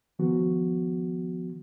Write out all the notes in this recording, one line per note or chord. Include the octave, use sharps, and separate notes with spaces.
D#3 F3 B3 F#4